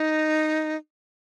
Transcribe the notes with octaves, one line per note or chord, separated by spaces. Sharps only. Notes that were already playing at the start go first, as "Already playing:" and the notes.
Already playing: D#4